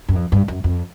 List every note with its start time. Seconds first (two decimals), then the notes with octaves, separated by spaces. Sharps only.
0.08 F#2
0.16 F2
0.32 G2
0.48 F#2
0.64 F2